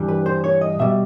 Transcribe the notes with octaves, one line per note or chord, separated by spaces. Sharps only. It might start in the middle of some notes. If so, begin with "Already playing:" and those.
Already playing: G2 E3 G3
B4
C5
C#5
D#5
B2 G3 E5